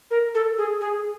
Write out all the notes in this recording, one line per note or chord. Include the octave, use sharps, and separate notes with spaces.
A#4
A4
G#4
G#4